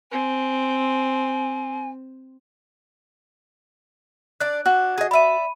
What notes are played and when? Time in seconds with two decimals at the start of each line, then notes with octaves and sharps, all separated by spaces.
0.12 C4 G#5
4.40 D4 D5 F#6
4.66 D4 F#4 F#6
4.98 G#4 D#5
5.11 D5 E5 B5 D#7